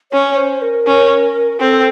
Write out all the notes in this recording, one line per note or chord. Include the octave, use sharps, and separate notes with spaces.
C#4 C#5
C5
A#4
C#4
C4 A4